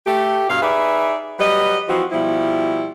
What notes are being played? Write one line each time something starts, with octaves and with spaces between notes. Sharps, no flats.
A3 G4
G2 B2 F5
D#4 G#4 B4 D5 E5
F#3 G3 B4 D#5
E3 F3 C4 F#4
B2 F3 G3 E4